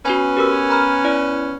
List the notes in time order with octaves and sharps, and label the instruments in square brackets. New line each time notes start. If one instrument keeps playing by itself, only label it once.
[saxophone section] B3 C#4 [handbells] F#4 B4 G#5
[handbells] G4 A#4 E6
A#5 B5 F6
E4 D5